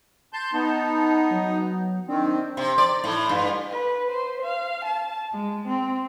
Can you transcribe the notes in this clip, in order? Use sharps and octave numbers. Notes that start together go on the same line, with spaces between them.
A5 C6 G6
B3 D#4 A5
F#3
D#3 C4 D4
C3
D5
A2
G2
B4
C5
F5
A5
G#3
C4